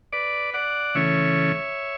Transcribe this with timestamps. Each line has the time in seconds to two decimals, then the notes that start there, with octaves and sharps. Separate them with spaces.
0.13 B4 D5
0.54 D5 F#5
0.95 C#3 E3 A3 C#4 C#5 E5